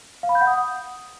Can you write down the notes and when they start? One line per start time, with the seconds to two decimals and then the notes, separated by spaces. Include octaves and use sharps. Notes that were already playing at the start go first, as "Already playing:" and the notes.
0.23 F5
0.29 B5
0.35 G6
0.41 F#5
0.47 D#6